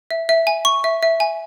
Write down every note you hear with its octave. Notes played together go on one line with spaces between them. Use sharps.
E5
E5
G#5
C#6
E5
E5
G#5